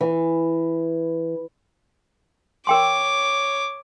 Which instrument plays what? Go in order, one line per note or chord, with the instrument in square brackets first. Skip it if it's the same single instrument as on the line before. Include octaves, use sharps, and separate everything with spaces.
[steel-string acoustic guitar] E3
[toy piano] A#4 G5 C6 [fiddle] C#5 D6